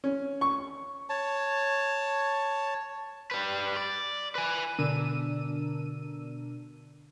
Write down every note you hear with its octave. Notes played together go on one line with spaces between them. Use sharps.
C#4
C#6
C#5 A5
G3 B4
D5
B4 G#5
B2 D3 D4 A#4 E6 D#7